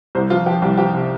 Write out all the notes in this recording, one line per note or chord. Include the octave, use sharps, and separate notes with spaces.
C2 C5
F3 F4
F3 G4
C2 G4
F3 G4
C3